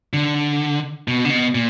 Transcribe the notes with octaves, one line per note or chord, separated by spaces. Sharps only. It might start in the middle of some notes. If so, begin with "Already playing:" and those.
D3
B2
D3
B2
A#2